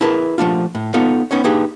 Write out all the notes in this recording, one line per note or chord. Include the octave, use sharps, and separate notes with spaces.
E4 G#4 A#4 B4 A5
F3 A3 D4 F4
A2
B3 D#4 F4 A4 C#5
B3 C#4 D#4 C#5
A#3 D4 D#4 G4 G#4 B4